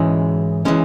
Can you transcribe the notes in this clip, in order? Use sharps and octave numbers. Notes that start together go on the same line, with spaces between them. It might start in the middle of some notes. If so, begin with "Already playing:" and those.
Already playing: G#2 E3 G#3 C#4
E3 G#3 C#4